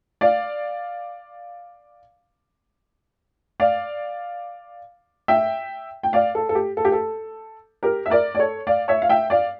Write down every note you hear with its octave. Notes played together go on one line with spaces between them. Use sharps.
D5 F5
D5 F5
E5 G5
G5
D5 F5
A4
A4
G4
A4
G4
A4
G4 A#4
E5
A#4 D5
D5
A4 C#5
D5 F5
C#5 E5
F5
E5 G5
D5 F5